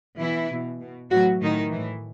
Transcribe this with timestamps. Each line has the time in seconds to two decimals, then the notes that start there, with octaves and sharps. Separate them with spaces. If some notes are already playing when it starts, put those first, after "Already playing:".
0.19 B2 E3 E4
0.50 B2
0.81 B2
1.10 A2 E3 F#3 F#4
1.41 A2 D#3 E3 D#4
1.71 A2 E3